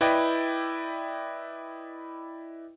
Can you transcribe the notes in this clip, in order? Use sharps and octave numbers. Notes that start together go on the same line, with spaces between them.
E4 B4 D5 D#5 G5